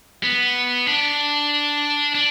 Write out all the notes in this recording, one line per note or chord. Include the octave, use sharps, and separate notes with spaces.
B3
D4
D4